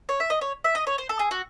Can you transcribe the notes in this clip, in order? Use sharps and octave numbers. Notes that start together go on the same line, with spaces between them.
C#5
E5
D#5
C#5
E5
D#5
C#5
C5
A4
G#4
F#4